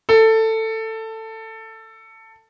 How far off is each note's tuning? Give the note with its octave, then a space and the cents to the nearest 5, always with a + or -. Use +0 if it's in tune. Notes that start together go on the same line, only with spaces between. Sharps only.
A4 +15